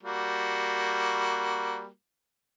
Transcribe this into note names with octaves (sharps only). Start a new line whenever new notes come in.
G3 A#3 F#4